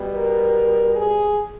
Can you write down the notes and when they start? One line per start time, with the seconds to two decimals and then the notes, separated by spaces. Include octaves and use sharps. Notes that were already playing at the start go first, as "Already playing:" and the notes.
Already playing: B2 G3
0.13 A#4
0.96 G#4